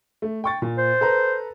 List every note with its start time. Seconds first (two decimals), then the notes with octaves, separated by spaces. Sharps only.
0.22 A3
0.44 G5 C#6 A6
0.62 A#2
0.78 C5
1.01 A4 B4 A#5